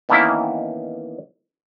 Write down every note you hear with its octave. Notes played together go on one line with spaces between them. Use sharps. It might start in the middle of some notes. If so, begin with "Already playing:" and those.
B2 D#3 E3 A#3 C#4 E4